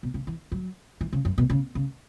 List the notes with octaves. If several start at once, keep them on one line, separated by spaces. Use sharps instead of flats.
B2
C#3
E3
F#3
E3
C#3
F#2
B2
C#3
C#3